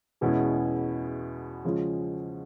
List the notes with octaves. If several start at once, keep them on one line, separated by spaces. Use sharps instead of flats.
E2 B2 G#3 C#4 E4
C#3 F3 G#3 C#4 F4